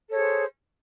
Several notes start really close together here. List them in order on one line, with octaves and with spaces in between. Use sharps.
A4 C#5 G#4 C5